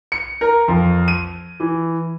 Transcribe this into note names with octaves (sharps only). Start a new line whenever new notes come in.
C#7
A#4
F2
D#7
E3